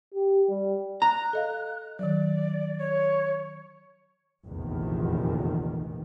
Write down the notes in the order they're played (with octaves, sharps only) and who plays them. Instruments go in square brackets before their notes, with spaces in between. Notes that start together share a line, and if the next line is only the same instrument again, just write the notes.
[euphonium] G4
G3
[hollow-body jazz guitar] A#5 [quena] F#6
[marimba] A4 D#5 F5
[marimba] D#3 F#3 [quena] D5
[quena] C#5
[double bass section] F1 A#1 E2 D#3